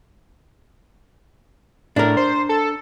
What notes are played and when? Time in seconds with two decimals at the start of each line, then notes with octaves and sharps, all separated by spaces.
1.96 A2 D4 A#4
2.17 C5
2.49 A4